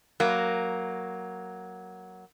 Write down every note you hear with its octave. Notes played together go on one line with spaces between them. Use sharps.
F#3 A#3